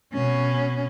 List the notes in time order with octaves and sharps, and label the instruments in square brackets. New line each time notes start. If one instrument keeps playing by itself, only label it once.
[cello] B2 C#4